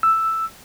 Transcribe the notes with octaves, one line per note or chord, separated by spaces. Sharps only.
E6